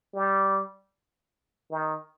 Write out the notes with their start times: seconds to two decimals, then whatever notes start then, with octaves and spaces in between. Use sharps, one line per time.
0.15 G3
1.71 D#3